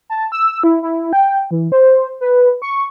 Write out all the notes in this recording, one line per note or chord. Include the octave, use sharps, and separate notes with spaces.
A5
E6
E4
E4
G5
E3
C5
B4
C#6